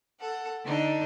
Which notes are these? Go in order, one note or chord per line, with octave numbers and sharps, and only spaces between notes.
A4 F#5
D3 D4 D#4